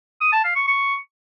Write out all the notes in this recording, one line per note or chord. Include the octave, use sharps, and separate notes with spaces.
D#6
A5
F5
C#6
C#6